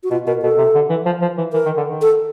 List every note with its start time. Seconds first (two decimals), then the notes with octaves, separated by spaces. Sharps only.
0.03 F#4
0.11 B2 F4
0.27 B2 A#4
0.42 B2 A4
0.58 C3
0.75 D3
0.90 E3
1.06 F3
1.22 F3
1.38 E3
1.53 E3 A#4
1.66 D#3
1.77 D3
1.89 D#3
2.02 A4